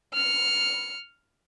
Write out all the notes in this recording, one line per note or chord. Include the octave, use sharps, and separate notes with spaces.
F6 C#7